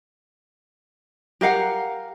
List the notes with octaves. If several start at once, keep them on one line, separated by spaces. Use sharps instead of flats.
G4 A#4 F5 F#5